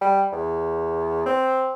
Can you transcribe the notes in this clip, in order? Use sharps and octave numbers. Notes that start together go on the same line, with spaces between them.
G3
E2
C4